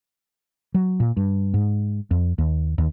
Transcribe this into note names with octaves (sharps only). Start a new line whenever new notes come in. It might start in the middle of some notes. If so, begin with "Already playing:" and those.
F#3
A#2
G2
G#2
F2
D#2
D#2